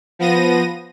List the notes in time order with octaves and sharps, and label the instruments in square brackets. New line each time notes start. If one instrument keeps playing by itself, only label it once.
[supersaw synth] F3 B3 A#6 D#7